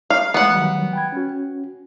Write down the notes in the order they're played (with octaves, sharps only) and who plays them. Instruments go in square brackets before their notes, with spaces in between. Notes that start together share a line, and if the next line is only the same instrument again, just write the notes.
[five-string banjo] F5
[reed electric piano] E3 G#3 A3 [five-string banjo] B3 F#5
[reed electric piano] D#3 F#3 G3
G5 B5 G#6
C#4 F#4